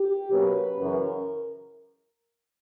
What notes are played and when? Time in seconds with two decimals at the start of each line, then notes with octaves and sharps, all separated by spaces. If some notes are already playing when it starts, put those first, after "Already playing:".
Already playing: G4
0.31 B2 F#3 A#3 C#4 B4
0.79 F#2 C#3 E3 A#4